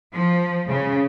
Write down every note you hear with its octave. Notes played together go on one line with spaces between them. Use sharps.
F3
C#3